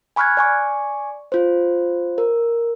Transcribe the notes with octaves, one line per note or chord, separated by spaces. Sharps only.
G#5 B5 C#6 F6 F#6 G#6
D5 G#5 C#6
F4 C5
A#4